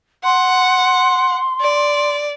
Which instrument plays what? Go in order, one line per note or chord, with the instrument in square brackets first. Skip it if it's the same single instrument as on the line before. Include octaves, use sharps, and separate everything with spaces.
[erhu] F#5 [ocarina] C6
[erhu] D5